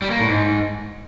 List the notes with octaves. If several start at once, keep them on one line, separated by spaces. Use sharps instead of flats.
G3
A#3
A2
G#2